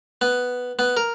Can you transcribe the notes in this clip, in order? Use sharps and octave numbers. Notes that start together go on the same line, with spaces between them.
B3
B3
A#4